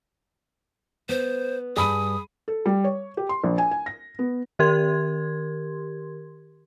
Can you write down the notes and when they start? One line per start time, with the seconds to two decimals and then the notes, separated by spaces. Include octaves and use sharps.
1.09 B3 C5
1.77 G2 G#4 G#5 B5 D#6 D#7
2.48 A4
2.66 G3
2.84 C#5
3.17 G4
3.29 C6
3.44 A#1
3.58 G#5
3.71 G#5
3.86 A#6
4.19 B3
4.59 D#3 G4 A#4 C6 G#6